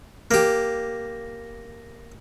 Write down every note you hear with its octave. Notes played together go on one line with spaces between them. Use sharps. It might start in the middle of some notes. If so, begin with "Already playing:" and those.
A#3 G4